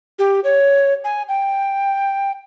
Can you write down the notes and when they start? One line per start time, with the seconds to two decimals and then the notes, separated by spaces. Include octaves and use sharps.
0.19 G4
0.44 C#5
1.04 G#5
1.29 G5